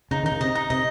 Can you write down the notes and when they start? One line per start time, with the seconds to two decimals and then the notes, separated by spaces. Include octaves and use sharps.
0.11 C#3 D#4
0.23 D#3 D#4
0.32 C#3
0.40 C3 D#5
0.55 D#4
0.70 C3 D#5